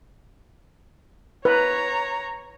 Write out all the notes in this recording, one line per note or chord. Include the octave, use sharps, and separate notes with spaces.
B4 C#5 A#5